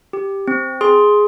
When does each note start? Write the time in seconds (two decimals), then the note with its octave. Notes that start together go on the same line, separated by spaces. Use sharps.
0.13 G4
0.48 C4
0.81 G#4 C6